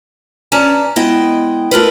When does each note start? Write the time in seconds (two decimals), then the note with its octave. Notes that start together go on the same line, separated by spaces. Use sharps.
0.52 C#4 D4 B4 A5 A#5
0.96 G#3 B3 E4 D#5 G5
1.71 A3 F4 A#4 B4